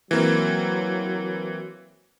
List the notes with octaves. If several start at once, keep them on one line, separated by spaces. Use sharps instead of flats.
E3 F#3 A#3 C4